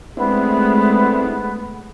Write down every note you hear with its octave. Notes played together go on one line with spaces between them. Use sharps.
G#3 A3 B3 C4 D4 E4 A4